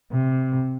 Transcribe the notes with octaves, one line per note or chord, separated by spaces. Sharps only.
C3